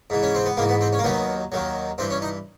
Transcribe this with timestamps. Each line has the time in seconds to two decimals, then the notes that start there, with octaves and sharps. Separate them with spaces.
0.10 G#2 E3
0.23 C#4
0.35 C4
0.46 B3
0.57 G#2 E3 A#3
0.69 B3
0.81 C4
0.93 C#4
0.99 A#3
1.04 D#2 D#3 F#3 B3
1.52 D#2 D#3 F#3
1.98 G2 E3 C4
2.10 C#4
2.22 D#4